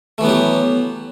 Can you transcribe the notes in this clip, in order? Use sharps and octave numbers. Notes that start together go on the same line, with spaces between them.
E3 F#3 A3 B3 G4